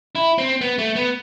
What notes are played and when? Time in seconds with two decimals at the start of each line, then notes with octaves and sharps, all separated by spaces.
0.15 E4
0.38 C4
0.61 B3
0.79 A3
0.96 B3